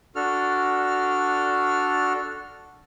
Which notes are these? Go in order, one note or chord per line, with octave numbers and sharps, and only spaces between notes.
D4 F#4 A4 F6